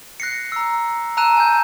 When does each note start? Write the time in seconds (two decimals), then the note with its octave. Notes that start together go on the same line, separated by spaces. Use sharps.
0.20 F#6 A#6 C7 C#7
0.52 A#5 E6
1.17 A5 A#5 E6 F#6 D#7 E7
1.36 G#5 G6